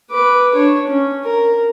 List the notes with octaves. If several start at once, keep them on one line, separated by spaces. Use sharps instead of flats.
B4 D6
D4 C#5
C#4
A#4